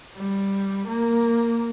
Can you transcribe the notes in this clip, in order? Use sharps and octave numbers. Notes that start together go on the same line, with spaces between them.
G3
A#3